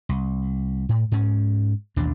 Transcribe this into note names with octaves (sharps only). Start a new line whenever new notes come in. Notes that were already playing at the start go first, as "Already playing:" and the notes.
C2
A2
G#2 C#4
A1 D#2 B2 D4